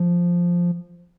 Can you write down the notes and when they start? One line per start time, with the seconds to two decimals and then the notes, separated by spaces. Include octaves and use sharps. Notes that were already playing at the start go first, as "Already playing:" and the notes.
Already playing: F3